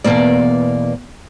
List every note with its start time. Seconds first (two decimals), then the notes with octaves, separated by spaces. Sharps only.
0.04 E2 G#2 B2 A#3 D5